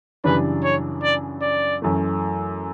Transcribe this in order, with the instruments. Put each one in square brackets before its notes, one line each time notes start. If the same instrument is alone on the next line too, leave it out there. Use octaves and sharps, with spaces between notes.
[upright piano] F#2 C#3 E3 G3 D4 [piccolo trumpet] B4
[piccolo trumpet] C#5
D5
D5
[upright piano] F#2 E3 A3